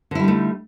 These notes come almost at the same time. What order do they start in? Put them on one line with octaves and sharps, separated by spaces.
D3 E4 G3 D#4 A3